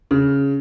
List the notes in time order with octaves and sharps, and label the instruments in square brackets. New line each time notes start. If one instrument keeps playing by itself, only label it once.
[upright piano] C#3